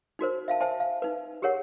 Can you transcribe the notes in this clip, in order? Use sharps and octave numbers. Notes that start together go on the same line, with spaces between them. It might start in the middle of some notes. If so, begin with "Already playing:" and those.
D#4 F#4 A#4 C5
E5 F5 A5
C5 E5 G#5 A5
F5
D#4 B4
G4 G#4 A#4 C#5 F#5